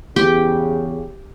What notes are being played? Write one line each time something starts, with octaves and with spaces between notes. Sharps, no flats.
E2 C#3 G4 G5